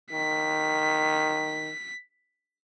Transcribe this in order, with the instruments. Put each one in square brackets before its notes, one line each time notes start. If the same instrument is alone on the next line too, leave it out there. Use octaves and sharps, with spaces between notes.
[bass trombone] D#3 [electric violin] B6